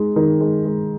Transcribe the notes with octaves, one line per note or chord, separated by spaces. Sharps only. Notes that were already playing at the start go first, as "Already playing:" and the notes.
Already playing: G#3 D#4
D#3
G#3
G#3